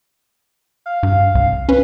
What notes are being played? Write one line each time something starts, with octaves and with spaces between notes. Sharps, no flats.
F5
G2
C2
C#4 B4